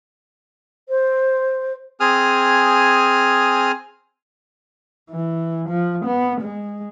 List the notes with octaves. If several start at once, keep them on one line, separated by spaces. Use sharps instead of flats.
C5
C4 G#4 G#5 D#6 F6
E3
F3
B3
G#3